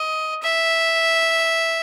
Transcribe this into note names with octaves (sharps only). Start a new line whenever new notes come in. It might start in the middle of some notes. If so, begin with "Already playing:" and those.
Already playing: D#5
E5